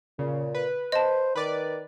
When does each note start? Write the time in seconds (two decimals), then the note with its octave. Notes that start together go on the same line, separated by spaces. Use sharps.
0.19 A#2 C#3
0.55 B4
0.92 C5 D#5 A5
1.36 D#3 B4 D5